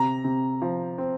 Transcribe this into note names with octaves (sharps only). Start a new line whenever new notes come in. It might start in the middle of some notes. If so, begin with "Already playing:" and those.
Already playing: C3 A#5
C3
F3
C4